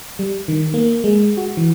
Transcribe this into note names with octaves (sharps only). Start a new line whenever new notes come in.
G3
D#3
A#3
G#3
F#4
E3